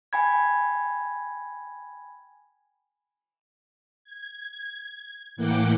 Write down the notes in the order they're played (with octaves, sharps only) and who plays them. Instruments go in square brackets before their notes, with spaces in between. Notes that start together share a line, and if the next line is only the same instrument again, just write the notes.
[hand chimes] G5 G#5 B5 G#6
[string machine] G#6
A2 E3 A#3 F#5 G5 D6